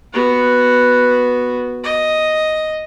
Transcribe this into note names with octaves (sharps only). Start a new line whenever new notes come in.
B3 F#4
D#5